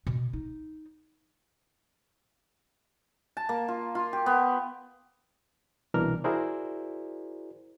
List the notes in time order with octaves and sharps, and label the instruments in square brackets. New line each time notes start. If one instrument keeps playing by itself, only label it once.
[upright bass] B2
D#4
[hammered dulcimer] A5
A#3
F4
F4
G4
B3
[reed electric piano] C2 B2 E3 D4 A#4 F6
E4 F#4 G#4 A#4 C5 D5